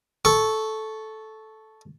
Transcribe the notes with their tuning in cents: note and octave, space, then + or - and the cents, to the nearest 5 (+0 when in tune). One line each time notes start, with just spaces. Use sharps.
A4 -10 C#6 +0